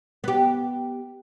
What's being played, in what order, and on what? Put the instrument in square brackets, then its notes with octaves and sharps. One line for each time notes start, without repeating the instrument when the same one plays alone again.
[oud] B3 G4